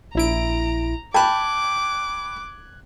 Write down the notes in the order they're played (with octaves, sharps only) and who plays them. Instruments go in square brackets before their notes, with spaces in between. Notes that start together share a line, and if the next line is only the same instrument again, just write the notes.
[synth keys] A#1 E4 D7 [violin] A#5
[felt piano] G5 A5 B5 [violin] D6 [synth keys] F#6 G#6